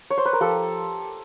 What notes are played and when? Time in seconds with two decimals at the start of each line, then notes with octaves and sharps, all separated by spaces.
0.10 C#5
0.18 C5
0.25 B4
0.33 A#4
0.41 F3 G4 A4